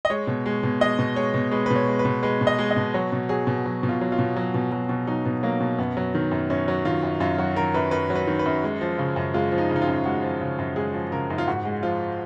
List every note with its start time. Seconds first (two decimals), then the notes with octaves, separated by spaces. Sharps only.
0.05 D#5
0.10 G#3 C#5
0.27 B2
0.46 G#3
0.63 B2
0.81 G#3 D#5
0.99 B2
1.16 G#3 C#5
1.34 B2
1.51 G#3 B4
1.66 B2 B4
1.76 C#5
1.88 G#3
1.99 B4
2.05 B2
2.23 G#3 B4
2.41 B2
2.47 D#5
2.58 G#3
2.71 D#5
2.76 B2
2.94 F#3 C#5
3.12 B2
3.29 F#3 G#4
3.47 B2
3.65 F#3
3.83 B2
3.89 F4
4.01 F#3
4.12 F4
4.19 B2
4.36 F#3
4.54 B2
4.72 F#3
4.89 B2
5.07 F#3 D#4
5.26 B2
5.43 F#3 A#3
5.61 B2
5.78 F#2 B3
5.97 F#3
6.15 D#3
6.31 F#2
6.50 F#2 C#4
6.68 F#3
6.85 D#3 F4
7.03 F#2
7.20 F#2 F4
7.38 F#3 F#4
7.56 D#3 A#4
7.74 F#2 B4
7.91 F#2 B4
8.10 F#3
8.16 B4
8.27 D#3
8.39 B4
8.46 F#2
8.63 G#3
8.81 F3
8.98 C#3
9.16 F#2
9.34 G#3 F4
9.52 F3
9.58 D#4
9.70 C#3
9.76 D#4
9.82 F4
9.87 F#2
10.05 G#3 F#4
10.23 F3
10.41 C#3
10.59 F#2
10.76 G#3 G#4
10.94 F3
11.12 C#3 A#4
11.30 F#2 D#4
11.38 F4
11.47 G#2 F#4
11.65 G#3
11.83 F3 F4